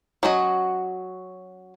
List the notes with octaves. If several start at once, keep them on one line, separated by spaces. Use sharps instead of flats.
F#3 C#4 F#4 D#5